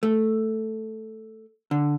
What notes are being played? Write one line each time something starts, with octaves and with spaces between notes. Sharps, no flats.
A3
D3